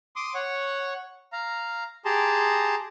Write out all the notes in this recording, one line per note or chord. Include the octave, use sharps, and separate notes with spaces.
C6 D6 D#6
C#5 F#5 C#6
F5 A#5
G4 G#4 A5 A#5 C6